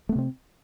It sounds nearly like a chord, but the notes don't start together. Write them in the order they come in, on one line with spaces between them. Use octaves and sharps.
A3 B3 C3 C4